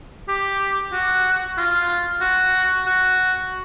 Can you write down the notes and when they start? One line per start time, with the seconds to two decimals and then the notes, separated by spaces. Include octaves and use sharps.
0.29 G4
0.93 F#4
1.58 F4
2.21 F#4
2.86 F#4